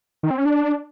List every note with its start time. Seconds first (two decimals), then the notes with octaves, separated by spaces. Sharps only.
0.23 D#3
0.31 C4
0.38 C#4
0.45 D4